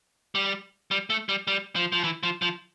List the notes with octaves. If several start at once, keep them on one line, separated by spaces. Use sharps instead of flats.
G3
G3
A3
G3
G3
F3
F3
E3
F3
F3